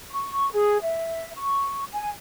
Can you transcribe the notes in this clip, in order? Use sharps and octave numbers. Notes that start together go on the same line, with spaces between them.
C#6
G#4
E5
C#6
G#5